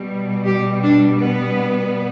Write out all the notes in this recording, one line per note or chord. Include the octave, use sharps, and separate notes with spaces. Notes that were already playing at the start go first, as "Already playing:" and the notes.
Already playing: B2 G3
G4
D4
B3